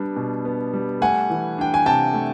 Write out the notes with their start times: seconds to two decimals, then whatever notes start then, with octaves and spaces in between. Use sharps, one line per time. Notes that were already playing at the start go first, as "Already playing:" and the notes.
Already playing: G3 B3 D4
0.16 B2
0.45 B3
0.73 G3
1.01 A3 F#5 G#5
1.30 E3
1.58 D4 G5
1.74 G#5
1.86 C3 G5 A5
2.14 A3